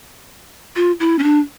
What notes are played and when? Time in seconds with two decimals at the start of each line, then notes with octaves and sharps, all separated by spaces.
0.76 F4
1.00 E4
1.19 C#4
1.23 D4